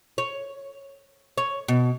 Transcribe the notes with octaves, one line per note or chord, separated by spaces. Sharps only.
C#5
C#5
B2